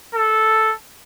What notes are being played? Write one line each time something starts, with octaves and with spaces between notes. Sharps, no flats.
A4